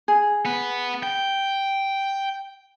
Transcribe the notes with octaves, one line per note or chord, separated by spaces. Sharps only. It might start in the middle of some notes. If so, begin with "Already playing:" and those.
G#4
B3 B4
G5